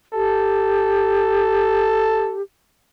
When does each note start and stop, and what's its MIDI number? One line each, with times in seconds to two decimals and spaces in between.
0.15 2.42 67
0.15 2.37 69